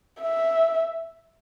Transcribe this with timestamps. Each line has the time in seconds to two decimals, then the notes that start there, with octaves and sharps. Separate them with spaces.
0.21 E5